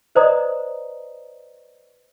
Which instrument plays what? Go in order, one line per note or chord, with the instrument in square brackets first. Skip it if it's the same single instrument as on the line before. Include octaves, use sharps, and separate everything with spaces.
[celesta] B4 C5 D5 D#5 A#5 D#6